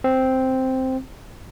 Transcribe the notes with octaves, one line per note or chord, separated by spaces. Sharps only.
C4